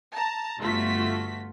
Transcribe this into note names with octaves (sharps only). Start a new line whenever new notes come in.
A5 A#5
G1 A3 F4 F#4 B6